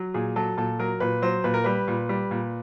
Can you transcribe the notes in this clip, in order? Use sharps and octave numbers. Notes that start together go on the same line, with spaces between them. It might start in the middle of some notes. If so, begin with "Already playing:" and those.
Already playing: F#3
A#2 G#4
F#3 A4
A#2 A4
F#3 A#4
A#2 B4
F#3 C5
A#2 B4
A#4
G3 B4
A#2
G3
A#2